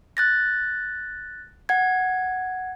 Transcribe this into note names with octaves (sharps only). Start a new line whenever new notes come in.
F#6 A6 A#6
F#5 G#6